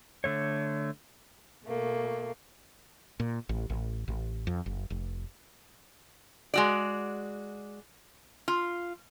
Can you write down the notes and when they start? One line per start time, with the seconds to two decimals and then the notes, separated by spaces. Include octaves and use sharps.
0.24 D3 A3 C#5
1.64 B2 A3 A#3
3.20 A#2
3.49 A1
3.70 A1
4.08 A1
4.47 F2
4.66 F#1
4.90 F1
6.54 G#3 F#4 D5
8.48 F4